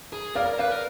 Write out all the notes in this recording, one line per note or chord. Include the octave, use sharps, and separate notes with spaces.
G#4
A#4 D5 F5
A#4
B4 D5 F5
A#4